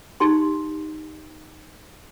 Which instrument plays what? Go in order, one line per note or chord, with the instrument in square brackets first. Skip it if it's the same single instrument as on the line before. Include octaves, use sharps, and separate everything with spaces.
[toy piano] D#4 G4 C6